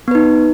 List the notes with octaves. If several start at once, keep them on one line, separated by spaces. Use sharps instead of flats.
B3 D#4 B4